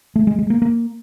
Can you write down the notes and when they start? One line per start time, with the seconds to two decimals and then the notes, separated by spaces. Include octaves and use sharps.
0.16 A3
0.27 G#3
0.39 G#3
0.50 A#3
0.62 A#3